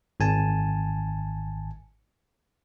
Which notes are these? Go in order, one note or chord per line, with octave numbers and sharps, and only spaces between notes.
G#1 G#5 A5